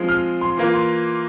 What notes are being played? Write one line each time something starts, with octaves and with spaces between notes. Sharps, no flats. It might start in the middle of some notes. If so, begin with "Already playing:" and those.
Already playing: F3 G#3 C4 F4
F6
C6
E3 A#3 F4
C6